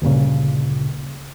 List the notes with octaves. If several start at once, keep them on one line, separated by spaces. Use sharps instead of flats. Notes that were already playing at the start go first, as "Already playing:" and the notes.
D2 G2 A#2 C#3